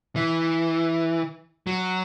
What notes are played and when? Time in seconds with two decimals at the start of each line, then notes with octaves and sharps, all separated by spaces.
0.16 E3
1.67 F#3